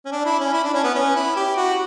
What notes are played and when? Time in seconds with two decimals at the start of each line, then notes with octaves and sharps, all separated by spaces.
0.05 C#4
0.12 D4
0.25 E4
0.40 C#4
0.53 E4
0.64 D4
0.74 C#4
0.84 B3
0.95 C#4
1.15 E4
1.36 G4
1.57 F#4